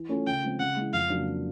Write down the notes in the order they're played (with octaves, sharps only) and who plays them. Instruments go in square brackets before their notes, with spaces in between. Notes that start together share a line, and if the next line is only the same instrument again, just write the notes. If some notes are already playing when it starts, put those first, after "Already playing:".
Already playing: [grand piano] E3
A3 C#4 F4 A4
[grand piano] C#3 [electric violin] G5
[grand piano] F3 G#3 C4
[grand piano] C#3 [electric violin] F#5
[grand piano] E3 G#3
[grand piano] F2 [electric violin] F5
[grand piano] C#3 F#3 A#3 D4